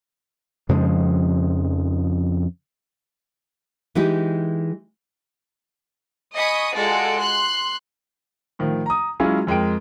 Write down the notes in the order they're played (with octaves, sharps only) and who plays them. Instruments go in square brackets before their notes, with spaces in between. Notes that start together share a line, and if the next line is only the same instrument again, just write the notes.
[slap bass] F2 C#3 F3 G#3
[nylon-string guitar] E3 G#3 D#4 E4 G4
[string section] D#5 G#5 B5 C#6 D#6
G#3 F4 F#4 A4 D5
C6 F#6
[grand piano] A2 D#3 F3
A#5 D#6
F#3 G#3 C#4 E4 F4 G#4
F2 G#3 A#4 G5 D7